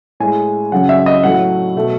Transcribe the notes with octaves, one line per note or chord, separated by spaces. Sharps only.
A2 G#3 G#5
F#2 C#3 F#3 F#5
E5
D#5
A2 F#3 A3 F#5
B2 A3